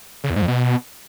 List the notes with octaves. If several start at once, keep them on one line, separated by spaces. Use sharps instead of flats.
C#3
E2
G#2
F2
B2